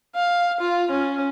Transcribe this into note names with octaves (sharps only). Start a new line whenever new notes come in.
F5
F4
C#4